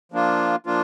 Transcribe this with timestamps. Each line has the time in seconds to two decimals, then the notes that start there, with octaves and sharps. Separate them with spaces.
0.12 F3 A#3 D4 F4
0.66 F3 A#3 D4 F4